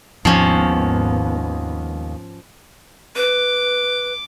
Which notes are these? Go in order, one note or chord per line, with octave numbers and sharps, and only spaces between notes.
G#1 D#2 G#2 F3 B3 C#4
B4 D6